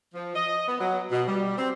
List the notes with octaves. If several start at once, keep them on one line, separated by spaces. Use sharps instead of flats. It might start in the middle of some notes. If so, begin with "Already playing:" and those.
F3
D#5
B3
F#3
B2
G3
C4